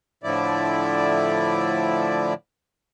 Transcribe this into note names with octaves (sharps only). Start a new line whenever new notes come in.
A2 D3 F3 E4 D5